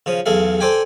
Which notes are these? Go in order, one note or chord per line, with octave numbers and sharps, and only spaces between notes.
C#3 F3 D#6
B1 E2 G#4 A4 F5
A4 C5 D5 G5 G#5